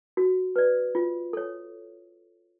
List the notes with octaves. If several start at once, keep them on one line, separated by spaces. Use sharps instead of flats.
F#4
B4 D5
F4
A4 C#5